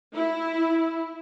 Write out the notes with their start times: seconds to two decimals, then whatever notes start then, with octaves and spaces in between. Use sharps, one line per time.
0.15 E4